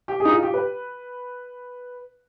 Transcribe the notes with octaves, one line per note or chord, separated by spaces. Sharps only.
G4
G#4
D#4
F4
G4
B4